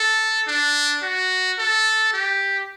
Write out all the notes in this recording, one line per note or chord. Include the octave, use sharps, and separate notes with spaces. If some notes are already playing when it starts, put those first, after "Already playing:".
Already playing: A4
D4
F#4
A4
G4